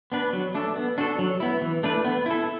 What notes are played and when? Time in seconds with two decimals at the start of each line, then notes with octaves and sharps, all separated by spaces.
0.12 B3 D4 B4
0.33 F#3
0.55 A3 D4 A4
0.76 B3
0.98 D4 F#4 A4
1.19 F#3
1.40 B3 E4
1.62 E3
1.83 A3 D4 B4
2.05 B3
2.26 E4 A4